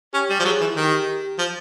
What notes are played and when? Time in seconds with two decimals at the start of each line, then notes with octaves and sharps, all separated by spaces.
0.13 C#4 G4
0.30 G3
0.39 F3
0.45 F#3 G#4
0.61 E3
0.76 D#3 G4
1.38 F3